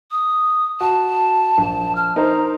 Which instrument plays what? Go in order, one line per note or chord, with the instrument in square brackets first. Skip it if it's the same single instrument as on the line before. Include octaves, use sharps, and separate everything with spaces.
[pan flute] D#6
[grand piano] F#4 [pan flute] A5
[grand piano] A#1
[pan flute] F6
[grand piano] D#4 A#4 C5 [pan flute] A#5